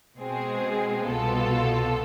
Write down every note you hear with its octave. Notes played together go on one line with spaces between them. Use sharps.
B2 G#3 C4 G#4
C2 B2 B3 F4 A4